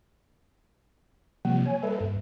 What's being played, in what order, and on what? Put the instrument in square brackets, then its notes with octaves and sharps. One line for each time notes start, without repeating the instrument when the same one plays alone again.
[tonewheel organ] C3 F3 G3 [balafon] A#3
[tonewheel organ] C#5 G#5
[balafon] G3 [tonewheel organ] A4 B4 E5
[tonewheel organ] G2